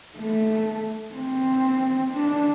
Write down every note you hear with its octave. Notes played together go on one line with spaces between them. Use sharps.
A3
C4
D4